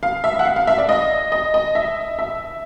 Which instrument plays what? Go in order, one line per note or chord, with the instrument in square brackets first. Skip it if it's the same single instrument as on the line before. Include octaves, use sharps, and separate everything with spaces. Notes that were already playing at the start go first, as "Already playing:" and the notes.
[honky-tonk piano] F5
E5
F#5
F5
F5
E5
D5
D#5
D#5
D#5
E5
E5